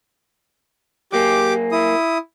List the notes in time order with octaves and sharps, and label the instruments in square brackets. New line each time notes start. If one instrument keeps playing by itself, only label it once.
[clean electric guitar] F#3 A#3 G#4 [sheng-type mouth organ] G4 D6
[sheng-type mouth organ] E4 D#6